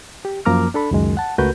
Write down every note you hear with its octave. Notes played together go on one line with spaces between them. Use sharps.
G4
F#2 F3 A#3 A#5 D6 F6
D4 A4 B5
C#2 F#2 D#3 G#3
F#5 A5
C#2 A3 F#4 A#4 B4 G6